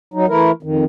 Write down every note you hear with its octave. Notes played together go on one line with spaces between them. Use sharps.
F#3 D#4
E3 A3 E4 A#4
F2 D#3